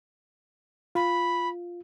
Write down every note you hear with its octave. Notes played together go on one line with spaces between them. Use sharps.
F4 B5